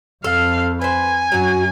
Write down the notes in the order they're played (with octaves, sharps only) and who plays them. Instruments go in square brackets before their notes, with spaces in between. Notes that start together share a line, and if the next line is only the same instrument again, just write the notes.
[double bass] F2 [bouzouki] A4 [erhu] F5
[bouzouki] B4 C5 [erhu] G#5
[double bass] F#2 [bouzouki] F#3 F#4